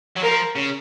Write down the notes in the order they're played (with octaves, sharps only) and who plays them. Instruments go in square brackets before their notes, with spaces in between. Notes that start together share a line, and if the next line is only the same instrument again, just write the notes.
[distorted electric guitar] F#3
[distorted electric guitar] F3 [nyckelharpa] A#4
[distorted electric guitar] C#3